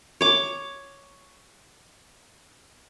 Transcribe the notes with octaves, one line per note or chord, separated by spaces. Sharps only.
C#5 D6